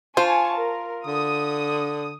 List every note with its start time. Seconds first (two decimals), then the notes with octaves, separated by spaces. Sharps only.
0.17 F4 C5 G#5 A5 C#6
0.55 A#4
1.07 D3 D#6